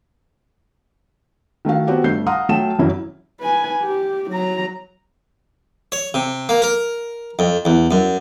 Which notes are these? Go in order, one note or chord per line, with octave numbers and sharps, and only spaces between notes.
D#3 A3 F#4 F5
B3 C4 F#4 G4
G1 A3 G6 C7
F5 F#5 A#5 C6 D#6 F6
F#3 A3 G5 A5 E7
F#1 C2 F#2 E3 F#3 E4
B4 G#5
G4
F#3 A#5
C#5
C3
A#3
A#4
F2
E2
F#2